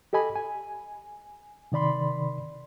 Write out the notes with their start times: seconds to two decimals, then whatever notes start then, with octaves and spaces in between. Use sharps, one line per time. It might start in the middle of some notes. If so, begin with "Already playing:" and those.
0.13 G4 A4 D#5 G#5 B5
0.35 G#5
1.72 C3 D#3 D5 B5 C6